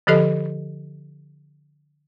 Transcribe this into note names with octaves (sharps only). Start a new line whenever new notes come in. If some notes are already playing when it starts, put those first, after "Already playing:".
D3 F3 G4 A4 D#5